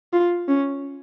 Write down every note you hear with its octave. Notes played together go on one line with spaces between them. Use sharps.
F4
C#4